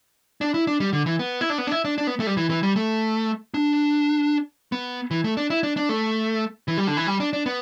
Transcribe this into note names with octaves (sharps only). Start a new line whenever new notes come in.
D4
E4
D4
G3
D3
E3
B3
E4
D4
B3
D4
E4
D4
D4
B3
A3
G3
E3
E3
G3
A3
D4
B3
E3
A3
D4
E4
D4
D4
A3
E3
G3
D3
E3
G3
D4
D4
B3